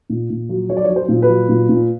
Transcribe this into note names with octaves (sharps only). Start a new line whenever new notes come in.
A#2
A#2
F#3
F#3 C#5
D5
C#5
F#3
C5
A#2
B4
F#3
A#2
A#2